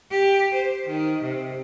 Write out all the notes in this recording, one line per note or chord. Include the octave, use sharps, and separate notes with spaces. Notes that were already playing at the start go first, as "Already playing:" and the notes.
G4
C5
D#3
C3